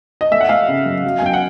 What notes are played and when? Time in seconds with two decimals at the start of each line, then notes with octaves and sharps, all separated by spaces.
0.21 D#5
0.31 A3 E5
0.41 F#5
0.49 A3 D#5 F5
0.68 C#3
0.86 F#2
1.04 F#3
1.19 G#5
1.22 F#2 G5
1.34 F#5